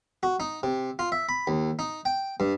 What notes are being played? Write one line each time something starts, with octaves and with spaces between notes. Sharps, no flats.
F#4
D#4
C3
F4
E5
B5
D#2
D#4
G5
G2